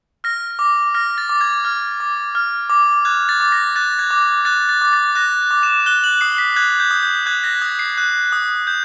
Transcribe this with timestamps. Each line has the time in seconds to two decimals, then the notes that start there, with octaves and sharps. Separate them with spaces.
0.24 F6 A#6
0.59 D6
0.94 F6 A#6
1.18 A6
1.29 D6
1.41 G#6
1.65 F6
2.00 D6
2.35 F6
2.70 D6
3.05 F#6 G#6
3.29 A6
3.40 D6
3.52 A#6
3.76 F#6 A6
3.99 G#6
4.11 D6
4.22 G#6
4.45 F#6 A6
4.69 A6
4.81 D6
4.93 A6
5.15 F#6 A#6
5.51 D6
5.63 E7
5.86 F#6 G7
6.04 F#7
6.21 D#6 C7
6.38 B6
6.56 F#6 G#6
6.80 G6
6.91 D#6
7.03 G6
7.26 F#6 G#6
7.44 A#6
7.61 D#6 G#6
7.79 C7
7.97 F#6
8.32 D#6
8.67 G6